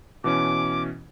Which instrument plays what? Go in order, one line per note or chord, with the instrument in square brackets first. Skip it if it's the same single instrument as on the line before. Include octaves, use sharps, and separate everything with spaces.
[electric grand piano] B2 E3 C#4 [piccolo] D6